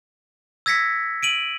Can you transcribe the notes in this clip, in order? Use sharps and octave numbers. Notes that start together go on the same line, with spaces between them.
E6 G#6 A#6 B6 C#7
D7 D#7 F#7